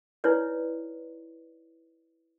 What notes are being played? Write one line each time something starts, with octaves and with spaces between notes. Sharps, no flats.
D#4 E4 B4 C#5 D5